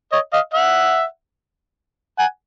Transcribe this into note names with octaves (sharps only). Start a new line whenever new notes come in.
C#5 D#5
D#5 F5
E5 F#5
F#5 G#5